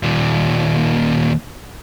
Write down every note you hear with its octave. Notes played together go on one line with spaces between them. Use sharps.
D#2 A#2